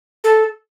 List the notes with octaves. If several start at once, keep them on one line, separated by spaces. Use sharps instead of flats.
A4